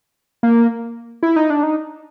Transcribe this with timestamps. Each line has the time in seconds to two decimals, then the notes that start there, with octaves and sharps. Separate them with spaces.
0.43 A#3
1.23 E4
1.36 D#4
1.50 D4
1.63 D#4